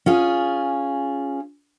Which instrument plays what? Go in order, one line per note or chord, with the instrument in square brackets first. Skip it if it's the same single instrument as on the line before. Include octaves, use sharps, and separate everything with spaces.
[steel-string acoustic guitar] C#4 F4 G#4